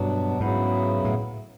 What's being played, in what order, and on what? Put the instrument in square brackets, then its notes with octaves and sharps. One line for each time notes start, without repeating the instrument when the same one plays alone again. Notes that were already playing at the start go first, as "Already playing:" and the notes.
Already playing: [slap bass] G2 [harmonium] B2 F#3 B3 D4
[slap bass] G#2 [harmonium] C#3 F#3 B3 E4
[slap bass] A2